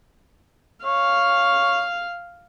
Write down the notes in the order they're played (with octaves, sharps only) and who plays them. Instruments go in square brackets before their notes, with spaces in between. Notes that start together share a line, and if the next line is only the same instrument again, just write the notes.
[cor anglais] C#5 [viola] F5